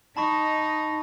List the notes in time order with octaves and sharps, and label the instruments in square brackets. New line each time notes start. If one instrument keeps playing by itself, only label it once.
[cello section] D#4 [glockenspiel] A5 B5 C#6